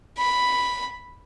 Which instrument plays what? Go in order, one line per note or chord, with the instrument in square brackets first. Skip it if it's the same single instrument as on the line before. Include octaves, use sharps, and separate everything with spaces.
[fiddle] B5